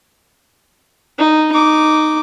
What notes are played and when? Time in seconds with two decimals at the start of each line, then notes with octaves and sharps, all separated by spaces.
1.19 D#4
1.53 D#4 D6